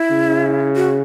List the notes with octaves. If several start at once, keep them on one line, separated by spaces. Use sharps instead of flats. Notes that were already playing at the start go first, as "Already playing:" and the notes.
Already playing: E4
C#3
F#4